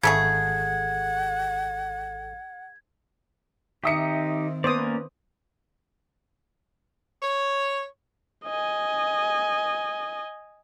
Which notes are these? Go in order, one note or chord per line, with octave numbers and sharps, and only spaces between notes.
G#1 C#3 A3 G#4 A4 F#5 G#6
D#3 C4 D#4 G4 E5 D#6 C#7
A#3 B3 C#4 B4 C5 D5 D6 D#6
C#5
D#5 G#5